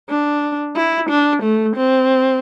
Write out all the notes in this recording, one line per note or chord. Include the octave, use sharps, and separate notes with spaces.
D4
E4
D4
A3
C4